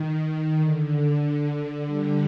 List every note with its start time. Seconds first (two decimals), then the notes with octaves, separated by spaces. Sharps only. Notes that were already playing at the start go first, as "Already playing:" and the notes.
Already playing: D#3
0.58 D3
1.86 G3